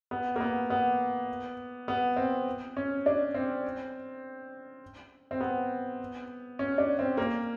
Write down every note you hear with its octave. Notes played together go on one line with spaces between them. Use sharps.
B3
A#3
B3
B3
B3
C4
C#4
D4
C4
C4
B3
C#4
D4
C4
A#3